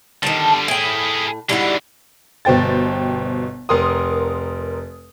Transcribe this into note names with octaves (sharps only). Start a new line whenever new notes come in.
D3 D#3 G3 A5
A2 E4 G#4 G5
G#2 D3 G3 E4 F#4
G1 B2 C5 G5 A6
F1 A#4 C6 D#6